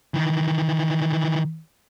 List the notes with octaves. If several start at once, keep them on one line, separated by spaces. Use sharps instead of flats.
D#3 E3